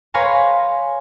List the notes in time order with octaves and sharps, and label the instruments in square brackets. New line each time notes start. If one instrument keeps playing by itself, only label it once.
[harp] B4 C#5 F5 G#5 A#5 C6